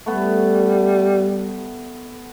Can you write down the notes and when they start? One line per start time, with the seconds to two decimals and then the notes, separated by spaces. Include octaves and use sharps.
0.06 G3 A3 B3